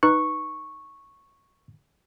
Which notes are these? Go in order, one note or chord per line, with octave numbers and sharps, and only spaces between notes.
D#4 B4 C#6 F#6